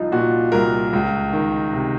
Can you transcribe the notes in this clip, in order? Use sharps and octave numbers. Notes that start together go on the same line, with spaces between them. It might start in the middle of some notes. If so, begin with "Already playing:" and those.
Already playing: C2 F3 D#4 F4
A#2 F#4
C2 A#4
C#2
D#3
C3